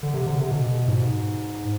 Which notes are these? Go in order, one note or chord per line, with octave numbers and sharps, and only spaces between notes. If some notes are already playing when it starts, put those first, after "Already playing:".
D3
C3
D3
C3
B2
G#2